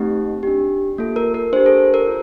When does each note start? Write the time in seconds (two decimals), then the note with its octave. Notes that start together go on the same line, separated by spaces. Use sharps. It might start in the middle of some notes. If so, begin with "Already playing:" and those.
Already playing: A3 C4 D#4 G4
0.43 D4 G4
0.98 A#3 F4 A4
1.16 A#4
1.34 A#4
1.53 D4 C5
1.56 G4
1.66 A4
1.94 A#4
2.07 F4